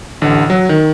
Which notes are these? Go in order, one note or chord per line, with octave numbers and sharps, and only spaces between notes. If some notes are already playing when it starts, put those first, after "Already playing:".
A1 D3
F#3
D#3